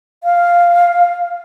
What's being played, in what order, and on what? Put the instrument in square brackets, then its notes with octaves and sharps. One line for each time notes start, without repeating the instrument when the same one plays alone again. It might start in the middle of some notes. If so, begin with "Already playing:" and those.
[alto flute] F5